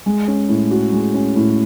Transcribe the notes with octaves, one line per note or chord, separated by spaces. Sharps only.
G#3
C#4
A2
F#4
G#3
C#4
A2